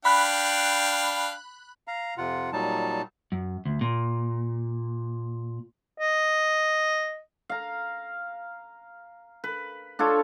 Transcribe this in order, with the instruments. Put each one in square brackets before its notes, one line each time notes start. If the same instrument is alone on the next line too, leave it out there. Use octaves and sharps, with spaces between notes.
[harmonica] D4 F5 G5 [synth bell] B5 F#6
[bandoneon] F5 A#5
F2 C3 F4 F#5
A#2 F#3 G3 D#4 A5
[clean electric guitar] F#2
D2
A#2
[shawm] D#5
[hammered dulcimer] F5 A#5
B4
D4 F4 A4 C#5